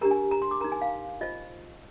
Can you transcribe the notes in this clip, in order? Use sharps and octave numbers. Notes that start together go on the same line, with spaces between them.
D4 G4 A#4 A#5
G#5
A#5
C6
D6
D#4 A#4 A#5
G#5
F5
F4 C5 D#5